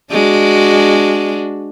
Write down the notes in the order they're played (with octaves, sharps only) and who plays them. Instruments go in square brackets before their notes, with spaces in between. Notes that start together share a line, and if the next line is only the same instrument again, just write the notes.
[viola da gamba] G#3 D4 F#4